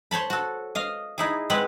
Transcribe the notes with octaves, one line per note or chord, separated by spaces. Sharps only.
C5 C#5 A5 B5
F#4 A4
D#5 F5
D#4 E4 G#4
G#3 C4 B4 F#5